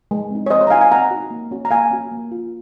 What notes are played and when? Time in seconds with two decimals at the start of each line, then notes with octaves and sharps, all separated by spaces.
0.11 G#3
0.31 C4 D#4
0.46 C#5
0.50 C4 C5 D#5
0.61 C5 D#5
0.67 A#5
0.70 D#4 F5 G#5
0.74 F#4
0.81 F5 G#5
0.91 C4 F#5 A#5
1.11 D#4 F#4
1.31 A#3
1.51 C#4 F#4
1.65 A#5
1.71 A#3 F5 G#5
1.91 C#4 F#4
2.11 A#3
2.31 F4